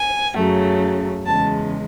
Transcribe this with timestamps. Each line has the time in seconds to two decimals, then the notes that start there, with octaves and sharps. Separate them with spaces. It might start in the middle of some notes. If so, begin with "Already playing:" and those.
Already playing: G#5
0.36 F#2 C#3 F#3 A3
1.25 E2 C#3 G#3 A5